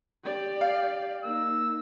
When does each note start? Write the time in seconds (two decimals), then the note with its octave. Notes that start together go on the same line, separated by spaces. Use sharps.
0.24 G4 D5
0.61 F5
1.24 A#3 D#4 E6